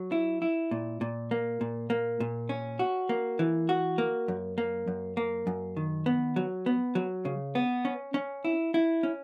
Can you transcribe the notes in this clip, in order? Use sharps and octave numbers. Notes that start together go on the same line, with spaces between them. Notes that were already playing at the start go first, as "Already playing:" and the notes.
Already playing: F#3
E4
E4
A#2
A#2
A#3
A#2
A#3
A#2
C#4
F#4
A#3
E3
F#4
A#3
F#2
A#3
F#2
A#3
F#2
D#3
B3
F#3
B3
F#3
C#3
B3
C#4
C#4
E4
E4
C#4